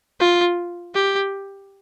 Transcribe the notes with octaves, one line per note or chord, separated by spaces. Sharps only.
F4
G4